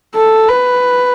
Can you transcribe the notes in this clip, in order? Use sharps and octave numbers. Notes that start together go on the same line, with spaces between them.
A4
B4